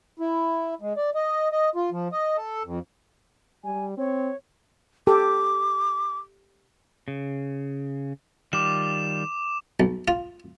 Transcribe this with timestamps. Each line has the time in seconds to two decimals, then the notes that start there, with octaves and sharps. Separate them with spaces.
0.19 E4
0.81 G#3
0.97 D5
1.15 D#5
1.52 D#5
1.75 F4
1.92 F3
2.12 D#5
2.36 A4
2.65 F2
3.64 G3 G#5
3.97 C4 C#5
5.07 G4 A4 D6
7.08 C#3
8.53 D#3 G3 F4 D6 E7
9.80 B1
10.08 F4